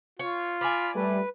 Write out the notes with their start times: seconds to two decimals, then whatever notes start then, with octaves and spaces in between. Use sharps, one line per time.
0.19 F4 C#5
0.61 D5 G#5 B5 F6
0.96 G3 A3 B4